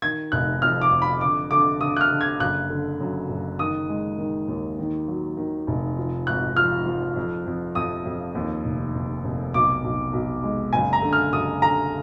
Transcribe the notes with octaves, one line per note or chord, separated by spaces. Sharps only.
D#3 G#6
F1 F#6
F2 F6
D6
F2
B5
D3 D6
D3 D6
D3 D#6
F#6
F6
D3
G#6
F#1 F#6
D3
F#2
F#1
D#3 D#6
G#3
D#3
D#2
D#3
F#3
D#3
F1
F3
G#1 F#6
F3 F6
F3
F2
F2
F2 D#6
F2
D#2
F1
F1
F1
B1 D6
B1
B1
G#3
F#1 G#5
A#5
D3
F6
F#1 D#6
D3 A#5